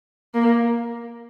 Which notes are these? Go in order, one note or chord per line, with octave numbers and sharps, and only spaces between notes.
A#3